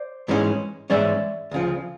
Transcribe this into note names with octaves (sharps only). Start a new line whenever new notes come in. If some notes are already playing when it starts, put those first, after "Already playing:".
Already playing: C5 D5
G#2 E3 G#3 C#4
G#2 E3 G#3 C#4 D5 E5
D2 C#3 F3